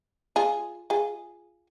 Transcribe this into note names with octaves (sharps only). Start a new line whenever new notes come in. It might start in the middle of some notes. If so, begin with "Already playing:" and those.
F4 G#4
F4 G#4